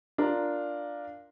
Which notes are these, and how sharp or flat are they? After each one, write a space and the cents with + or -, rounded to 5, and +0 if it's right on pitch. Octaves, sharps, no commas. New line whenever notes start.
D4 +0 F4 +0 A#4 +0